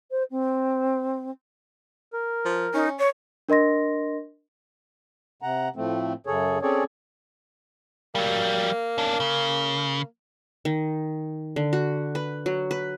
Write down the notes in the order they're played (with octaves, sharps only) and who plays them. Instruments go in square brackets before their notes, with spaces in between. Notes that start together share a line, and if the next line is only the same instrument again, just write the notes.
[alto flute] C5
C4
[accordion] A#4
[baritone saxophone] F3
[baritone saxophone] C#4 [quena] D#4
[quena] C#5
[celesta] D4 A#4 D#5 C6 A#6
[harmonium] C3 F#5 A#5
A2 F3 A3 C4
F#2 C#3 G#4 A4 C#5
C4 C#4 G#4 A4 C#5 D5
[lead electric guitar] F#3 G3 [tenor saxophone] A#3
[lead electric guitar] C#4 D4
C#3
[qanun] D#3
D3
F#4
B4
F#3
B4